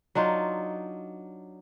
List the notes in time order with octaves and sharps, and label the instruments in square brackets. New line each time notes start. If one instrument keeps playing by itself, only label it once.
[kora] F#3 D4 D#4 F4